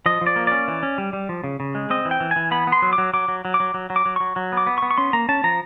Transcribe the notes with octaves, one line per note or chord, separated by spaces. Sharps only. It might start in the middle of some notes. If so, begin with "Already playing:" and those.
F3 D#5
F3
D5
A#3
C#4 D5
E3
C#4
G3
G3
F3
C#3
C#3
G#3
C4 D#5
E3
G5
E3
G#5
E3
B3 B5
B3
C6
F#3
D6
F#3
F#3 D6
F#3
F#3
D6
F#3
F#3
F#3
D6
F#3
F#3 C#6
F#3
B3
D6
B3
C#6
B3
C#6
C#4 C6
A#3 A#5
C#4 A5
F3 A#5